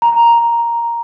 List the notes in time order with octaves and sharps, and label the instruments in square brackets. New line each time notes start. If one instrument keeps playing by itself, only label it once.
[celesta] A#5